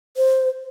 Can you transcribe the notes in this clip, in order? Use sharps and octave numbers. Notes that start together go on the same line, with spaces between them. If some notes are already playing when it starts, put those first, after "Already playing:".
C5